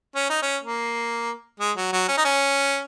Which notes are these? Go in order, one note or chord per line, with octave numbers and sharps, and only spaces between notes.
C#4
D#4
C#4
A#3
G#3
F#3
F#3
C#4
D#4
C#4